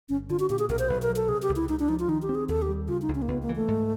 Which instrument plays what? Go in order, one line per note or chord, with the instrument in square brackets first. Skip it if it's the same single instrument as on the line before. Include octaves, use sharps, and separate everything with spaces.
[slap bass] G1 [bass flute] C#4
[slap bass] D3 [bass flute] F4
[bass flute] F#4
[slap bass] A#2 [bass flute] G4
[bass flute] G#4
[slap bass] B1 [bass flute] A#4
[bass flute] C5
[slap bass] B1 [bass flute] B4
[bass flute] A#4
[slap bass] F#3
[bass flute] A4
[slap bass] C3 [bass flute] G#4
[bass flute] G4
[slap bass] C#2
[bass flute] E4
[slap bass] C#2 [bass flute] D#4
[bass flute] D4
[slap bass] F3 [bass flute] D#4
[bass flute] F4
[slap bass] D#3 [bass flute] D#4
[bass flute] G4
[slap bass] C4
[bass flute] G#4
[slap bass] D#2 [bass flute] A4
[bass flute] G4
[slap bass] G3
[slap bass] C#3 [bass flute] F4
[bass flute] D#4
[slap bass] C#2
[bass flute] C#4
A#3
[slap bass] C#2 [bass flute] B3
[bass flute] A#3
[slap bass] E3
[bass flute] A3
[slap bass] G#2